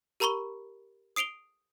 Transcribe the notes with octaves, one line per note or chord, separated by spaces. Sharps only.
G4 A#4 A#5 B5 C#6 G7
D#6 C7 D7 F7 G7